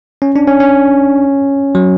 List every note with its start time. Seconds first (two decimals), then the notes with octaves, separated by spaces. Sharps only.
0.22 C#4
0.36 D4
0.47 C#4
0.60 C#4
1.75 F#3